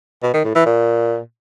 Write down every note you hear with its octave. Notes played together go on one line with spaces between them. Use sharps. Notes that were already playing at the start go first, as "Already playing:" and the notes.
B2
D#3
A2
E3
A#2